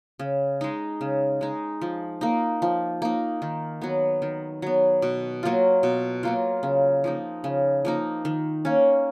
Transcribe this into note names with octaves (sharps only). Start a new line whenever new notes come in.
C#3
G#3 D#4
C#3
G#3 D#4
F3
A#3 D#4
F3
A#3 D#4
D#3
F#3 B3
D#3
F#3 B3
B2
F#3 A#3 F4
B2
F#3 A#3 F4
C#3
F3 A#3 D#4
C#3
F3 A#3 D#4
D#3
A#3 C#4